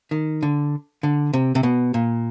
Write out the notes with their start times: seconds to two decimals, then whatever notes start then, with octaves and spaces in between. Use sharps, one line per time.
0.11 D#3
0.43 D3
1.03 D3
1.33 C3
1.55 C3
1.63 B2
1.94 A#2